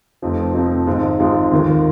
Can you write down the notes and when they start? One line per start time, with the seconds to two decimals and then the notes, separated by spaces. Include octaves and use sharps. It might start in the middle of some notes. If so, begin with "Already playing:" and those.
0.22 F1 F2 F3 C4 D#4
0.54 F1 F2 F3 C4 D#4
0.86 G#1 G#2 G#3 C4 F4
1.19 G#1 G#2 G#3 C4 F4
1.51 D#2 D#3 A#3 F4 A#4